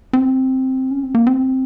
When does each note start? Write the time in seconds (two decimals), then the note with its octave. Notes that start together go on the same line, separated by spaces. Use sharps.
0.13 C4
0.91 C#4
1.03 C4
1.15 A#3
1.27 C4